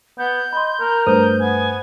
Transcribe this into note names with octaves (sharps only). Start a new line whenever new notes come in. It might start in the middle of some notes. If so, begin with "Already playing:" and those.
B3 G6
D#5 B5 C6
A#4
G2 A3 B4 C5 D#6 G6
B3 G#5